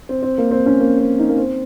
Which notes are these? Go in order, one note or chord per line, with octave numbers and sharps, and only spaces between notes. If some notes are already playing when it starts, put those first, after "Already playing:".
C4
C4
A#3
C4
C#4
A#3
C4
D#4
A#3
C4